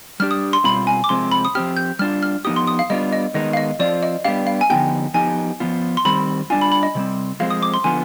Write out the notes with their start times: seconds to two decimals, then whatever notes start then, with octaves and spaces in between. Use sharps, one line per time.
0.20 G3 D4 G4 F6
0.31 D#6
0.53 C6
0.64 B2 G3 C4 F4 B5
0.87 G#5
1.04 D6
1.09 C3 F3 G#3 C4 C6
1.31 B5
1.45 D#6
1.55 F3 C4 G4 F6
1.77 G6
1.99 G3 D4 F4 F6
2.23 F6
2.45 F3 B3 D#4 G4 D#6
2.56 C6
2.67 D#6
2.79 F5
2.90 G3 B3 D4 F4 D#5
3.12 D#5
3.34 D#3 G#3 B3 D#4 D#5
3.53 F5
3.57 D#5
3.79 F3 C4 F4 D5
4.03 D#5
4.25 G3 B3 D4 G4 F5
4.47 F5
4.61 G#5
4.70 D3 F3 B3 D#4 G4 G5
5.14 F3 B3 D#4 G4 G#5
5.60 F3 B3 F4
5.97 C6
6.05 D#3 G3 C4 B5
6.50 G3 D4 F4 G#5
6.61 B5
6.72 B5
6.83 D#5
6.95 C3 G3 C4
7.40 F3 G#3 C4 F5
7.50 D#6
7.63 D6
7.74 C6
7.84 D3 F3 B3 F4 G#5